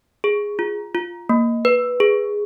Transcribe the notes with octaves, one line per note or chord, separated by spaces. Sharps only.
G#4
F4
F4
A#3
B4
G#4